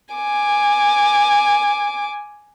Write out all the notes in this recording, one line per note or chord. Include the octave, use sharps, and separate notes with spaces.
G#5 D6